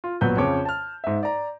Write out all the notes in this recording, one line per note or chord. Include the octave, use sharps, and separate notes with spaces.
F4
A#1 F#3 B3 B4 G6
F2 C#3 C#5 D6
A5 F6
G#2 E5
D5 A#5